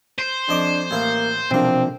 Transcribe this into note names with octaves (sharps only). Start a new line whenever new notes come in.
C5
F2 D4 D#5 D6
A1 A#3 E4 F5
B1 C3 F3 A#3 C4 D4